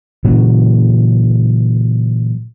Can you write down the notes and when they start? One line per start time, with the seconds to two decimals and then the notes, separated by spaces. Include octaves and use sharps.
0.25 A#2 C#3 E3 F#3